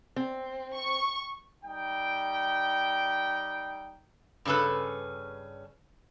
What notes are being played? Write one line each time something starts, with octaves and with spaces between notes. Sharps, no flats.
C4
C#6
G3 D#4 G5
G2 C#3 C#4 A4 B4